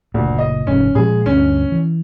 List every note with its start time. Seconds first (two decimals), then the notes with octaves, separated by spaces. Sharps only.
0.14 F#1 D2 A#2
0.38 D#5
0.67 F1 G#2 C#4
0.95 A#2 F3 G#3 G#4
1.26 D2 G2 C#4
1.72 E3